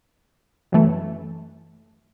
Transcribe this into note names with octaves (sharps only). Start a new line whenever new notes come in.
F#2 E3 A3